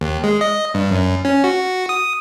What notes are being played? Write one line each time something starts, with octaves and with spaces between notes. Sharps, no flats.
D#2
G#3
D#5
G2
F#2
C#4
F#4
D#6